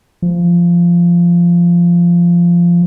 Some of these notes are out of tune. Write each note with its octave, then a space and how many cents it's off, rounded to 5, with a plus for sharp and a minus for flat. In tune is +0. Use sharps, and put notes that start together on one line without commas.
F3 -15